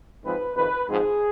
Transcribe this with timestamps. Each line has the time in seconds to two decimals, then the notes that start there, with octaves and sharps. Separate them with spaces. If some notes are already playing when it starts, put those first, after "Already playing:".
0.24 G#2 F3 G#3 C4 B4
0.56 F2 C3 D#3 B4
0.88 G#2 F3 G#3 C4 G#4